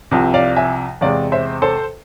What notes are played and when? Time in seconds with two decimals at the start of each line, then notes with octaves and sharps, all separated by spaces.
0.11 C2 C3 F3
0.34 D5 F5
0.56 E5 G#5
1.01 E2 C3 G#3 D5 F5
1.32 C5 E5
1.62 A4 C5